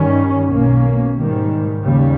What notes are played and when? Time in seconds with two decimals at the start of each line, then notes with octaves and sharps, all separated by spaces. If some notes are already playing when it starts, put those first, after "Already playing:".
Already playing: G2 D#3 G3 C#4
0.48 B1 B2 A#3 C#4
1.16 G#2 D#3 G3
1.82 D#2 C#3 G3